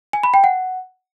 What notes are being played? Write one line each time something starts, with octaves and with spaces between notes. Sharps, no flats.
G#5
B5
G5
F#5